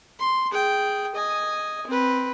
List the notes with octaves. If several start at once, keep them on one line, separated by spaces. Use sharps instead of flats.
C6
G#4 G5
D#5 G#5
C4 B4